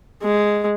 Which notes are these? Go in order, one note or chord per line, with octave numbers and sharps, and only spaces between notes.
G#3